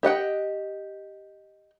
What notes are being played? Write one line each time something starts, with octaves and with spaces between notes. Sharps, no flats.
G4 D#5 F#5 G5